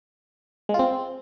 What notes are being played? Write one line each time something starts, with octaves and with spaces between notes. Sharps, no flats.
G#3
F4
C4